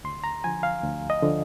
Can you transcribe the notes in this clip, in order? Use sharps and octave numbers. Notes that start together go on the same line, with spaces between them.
D2 C6
A#5
D3 F3 G#5
F5
D2
D#5
D3 F3